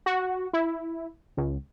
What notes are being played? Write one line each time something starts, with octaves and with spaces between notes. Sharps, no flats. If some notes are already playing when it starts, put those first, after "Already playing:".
F#4
E4
C#2